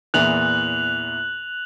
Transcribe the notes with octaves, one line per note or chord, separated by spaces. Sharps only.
E2 A#2 E3 F#6 F7 F#7